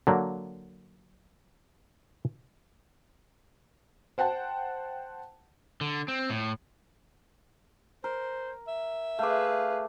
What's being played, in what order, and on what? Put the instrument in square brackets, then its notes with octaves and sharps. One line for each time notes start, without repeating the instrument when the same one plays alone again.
[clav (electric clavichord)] D3 F#3 A#3
[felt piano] C5 F#5 G5 A5
[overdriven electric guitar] D3
C4
A2
[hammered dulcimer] A#4 [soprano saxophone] C5
[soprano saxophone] E5
[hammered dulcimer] A3 D6 [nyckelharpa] G#4 B4 [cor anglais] F5